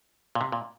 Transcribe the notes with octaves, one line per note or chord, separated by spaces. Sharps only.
A#2
C3
A#2